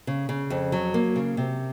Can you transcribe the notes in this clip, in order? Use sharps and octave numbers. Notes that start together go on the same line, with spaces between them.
C#3
C#3
F2
F#3
A#3
C#3
C3